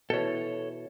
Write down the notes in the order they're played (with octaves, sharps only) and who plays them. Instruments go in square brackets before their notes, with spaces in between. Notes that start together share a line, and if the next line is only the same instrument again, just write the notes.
[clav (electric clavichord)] B2 E3 [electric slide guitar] A4 C#5